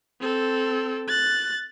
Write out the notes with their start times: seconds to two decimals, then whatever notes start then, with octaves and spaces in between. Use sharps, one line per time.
0.21 C4 A4
1.08 F#6 A6